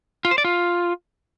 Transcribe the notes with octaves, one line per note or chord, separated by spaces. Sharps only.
F4
C5
D5
F4